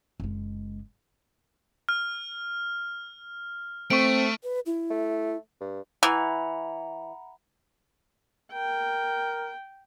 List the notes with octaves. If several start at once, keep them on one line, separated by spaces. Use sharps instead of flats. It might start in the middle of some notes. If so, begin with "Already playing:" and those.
F#1 G#3
F6
A3 C4 C#6 D7
B4
E4
A3
G2
E3 F#5 A#5 B5
A#4 G5